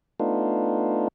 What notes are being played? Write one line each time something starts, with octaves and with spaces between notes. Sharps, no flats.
A3 B3 D4 D#4 F4